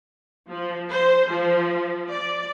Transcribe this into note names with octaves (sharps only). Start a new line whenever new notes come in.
F3
C5
F3
D5